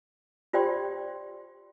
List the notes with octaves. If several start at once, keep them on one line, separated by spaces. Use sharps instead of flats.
F4 G4 C5 D5 G5 C6